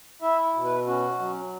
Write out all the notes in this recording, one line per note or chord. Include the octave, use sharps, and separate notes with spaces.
E4 E5
B2
B4
C#4 F#4
F#3